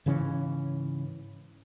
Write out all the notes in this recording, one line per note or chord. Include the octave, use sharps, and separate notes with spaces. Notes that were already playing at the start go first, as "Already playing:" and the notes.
G#2 C#3 E3 C#4